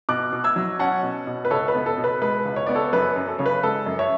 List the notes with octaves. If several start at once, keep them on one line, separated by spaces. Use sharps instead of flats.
B2 D6 F#6
B2
E6 G#6
F#3
C#4 F#5 A5
B2
B2
B4
C#2 A4 C#5
B4
B3
A4
B2
B4
G#3 B4
C#2
C#5
B3 D5
A4 C#5
F#2 B4
F#2
A4
C#3 C#5
B4
G#3 A4
F#2
C#5 E5